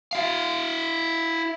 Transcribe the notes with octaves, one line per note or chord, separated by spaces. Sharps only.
E4 F5